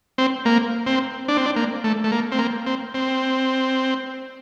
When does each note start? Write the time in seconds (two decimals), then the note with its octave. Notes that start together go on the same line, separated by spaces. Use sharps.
0.18 C4
0.45 A#3
0.86 C4
1.28 D4
1.37 C4
1.46 D4
1.56 A#3
1.84 A3
2.04 A3
2.12 A#3
2.32 C4
2.39 A#3
2.67 C4
2.94 C4